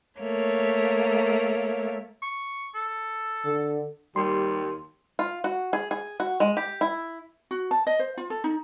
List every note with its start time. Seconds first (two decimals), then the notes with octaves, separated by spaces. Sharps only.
0.20 A3 A#3 C#5
2.22 C#6
2.75 A4
3.46 D3
4.16 D#2 G3 C6
5.19 F4
5.44 F#4
5.73 G#4
5.91 G#4
6.20 F#4
6.40 G#3
6.57 G4
6.81 E4
7.51 F#4
7.71 A5
7.87 D#5
7.99 C5
8.17 F4
8.30 A4
8.44 D#4